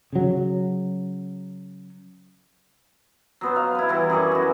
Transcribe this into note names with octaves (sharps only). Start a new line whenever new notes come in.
C#3 F#3
F#3 B3 C5
F5
E4 B4
E3 F#3 G3
F#2 G#4 D5 C#6
E4 F#4